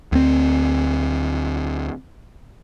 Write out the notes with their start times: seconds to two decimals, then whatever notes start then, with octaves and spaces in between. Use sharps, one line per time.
0.12 D2 C4